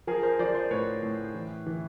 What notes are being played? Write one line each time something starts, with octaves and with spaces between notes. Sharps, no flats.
F3 G#4 A#4
A#4 C5
F3 C5 D5
C5 D5
A2 B4 C#5
A2
E3
E3